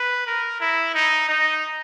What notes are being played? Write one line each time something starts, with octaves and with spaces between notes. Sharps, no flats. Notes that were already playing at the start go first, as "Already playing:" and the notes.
Already playing: B4
A#4
E4
D#4
D#4